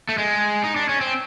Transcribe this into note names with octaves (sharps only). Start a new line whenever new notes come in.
A3
G#3
D#4
D4
C#4
C4